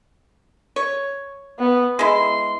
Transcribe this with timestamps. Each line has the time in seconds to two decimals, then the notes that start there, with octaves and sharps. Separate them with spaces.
0.76 C#5
1.59 B3
1.99 G#3 E4 C6